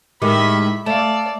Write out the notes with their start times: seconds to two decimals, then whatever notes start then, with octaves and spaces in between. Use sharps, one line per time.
0.22 A2 D#3 G#3 G4 E5 B5
0.86 A3 D5 F5 A5